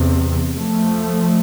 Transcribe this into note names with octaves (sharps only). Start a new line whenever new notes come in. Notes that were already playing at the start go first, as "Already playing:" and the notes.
Already playing: E2 C3
F3 A3